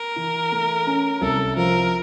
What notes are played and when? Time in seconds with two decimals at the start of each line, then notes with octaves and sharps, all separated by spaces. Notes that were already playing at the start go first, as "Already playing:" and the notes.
Already playing: A#4
0.16 E3
0.52 A3
0.87 C#4
1.21 C2 A4
1.56 F3 A#4